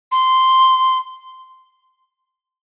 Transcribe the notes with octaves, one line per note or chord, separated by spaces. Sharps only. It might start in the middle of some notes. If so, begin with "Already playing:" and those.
C6